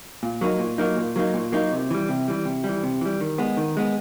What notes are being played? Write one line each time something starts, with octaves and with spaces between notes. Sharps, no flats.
A#2
F#3 A#3 D#4
A#2
F#3 A#3 D#4
A#2
F#3 A#3 D#4
A#2
F#3 A#3 D#4
C3
E3 G3
C3
E3 G3
C3
G3
E3
C3
E3 G3
D#3
G#3 B3
D#3
G#3 B3